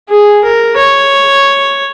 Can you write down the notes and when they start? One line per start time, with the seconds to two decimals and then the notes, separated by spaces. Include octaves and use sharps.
0.09 G#4
0.43 A#4
0.76 C#5